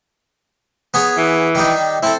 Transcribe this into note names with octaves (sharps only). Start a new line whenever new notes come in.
B3 G#4 C#5
E3
D#3 G3 D#4
C4 E4 A4